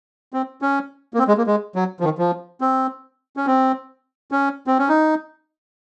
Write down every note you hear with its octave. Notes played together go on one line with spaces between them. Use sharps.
C4
C#4
A#3
C4
G#3
A#3
G#3
F#3
F3
D#3
F3
C4
C#4
C4
C#4
C4
C#4
D#4